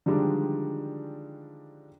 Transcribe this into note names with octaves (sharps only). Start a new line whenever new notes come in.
D3 D#3 F3 G3 G#3 D4